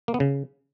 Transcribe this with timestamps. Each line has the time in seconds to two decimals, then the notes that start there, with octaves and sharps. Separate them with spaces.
0.08 A#3
0.14 B3
0.20 C#3